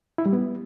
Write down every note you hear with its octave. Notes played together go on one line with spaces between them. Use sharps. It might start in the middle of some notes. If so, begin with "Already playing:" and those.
E4
G3
B3